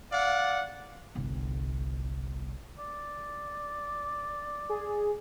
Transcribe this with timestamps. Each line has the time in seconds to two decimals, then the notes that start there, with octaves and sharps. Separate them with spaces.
0.12 D5 F5 F#5
1.15 G1 C2
2.78 D5
4.69 G#4